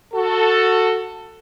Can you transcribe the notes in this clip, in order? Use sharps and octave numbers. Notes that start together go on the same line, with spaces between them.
F#4 A4